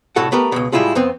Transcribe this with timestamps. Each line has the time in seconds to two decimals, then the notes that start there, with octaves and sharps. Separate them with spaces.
0.16 C2 A2 F#4 A4 F#5
0.32 A3 B3 G4 A#4
0.52 C#2 F#2 B2
0.72 A2 G3 G#3 E4 F4 G#4
0.95 F2 B3 C4